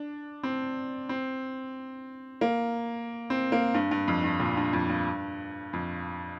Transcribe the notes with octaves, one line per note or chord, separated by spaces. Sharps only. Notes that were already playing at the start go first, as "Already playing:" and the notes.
Already playing: D4
C4
C4
A#3
C4
A#3
G2
G2
F2
G2
A#2
G2
F2
G2
F2